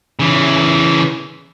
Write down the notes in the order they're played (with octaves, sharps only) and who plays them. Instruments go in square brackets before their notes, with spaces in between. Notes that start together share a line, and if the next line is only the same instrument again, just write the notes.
[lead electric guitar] C#3 E3